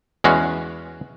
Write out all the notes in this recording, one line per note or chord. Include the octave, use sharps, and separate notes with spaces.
E2 G#3 C#4 F#4